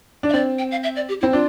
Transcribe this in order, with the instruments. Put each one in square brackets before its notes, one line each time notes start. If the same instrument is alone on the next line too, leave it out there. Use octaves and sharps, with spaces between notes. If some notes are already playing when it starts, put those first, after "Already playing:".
[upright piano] D4
[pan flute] E5
[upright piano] C4 [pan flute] D5
[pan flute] G5
F5
E5
D5
G4
[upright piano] C4 [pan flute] E4
[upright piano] D4 [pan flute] F4